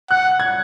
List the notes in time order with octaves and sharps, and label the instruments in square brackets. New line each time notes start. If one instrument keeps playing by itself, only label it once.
[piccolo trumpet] F#5 [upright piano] F#6
[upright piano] G#6